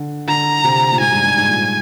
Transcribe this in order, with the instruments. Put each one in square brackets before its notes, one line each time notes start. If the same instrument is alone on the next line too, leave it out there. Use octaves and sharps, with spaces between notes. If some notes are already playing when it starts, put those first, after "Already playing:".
Already playing: [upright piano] D3
[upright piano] D3 [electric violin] A#5
[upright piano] C3
A#2
[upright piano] G#2 [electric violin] G#5
[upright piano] G2
G2
G#2
A#2